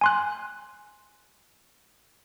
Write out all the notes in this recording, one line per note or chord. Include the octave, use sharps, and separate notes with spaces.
G#5 C6 F#6